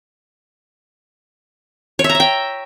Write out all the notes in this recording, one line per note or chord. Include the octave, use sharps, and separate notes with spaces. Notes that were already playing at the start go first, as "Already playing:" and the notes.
C#5
E5
A#5
E5
G5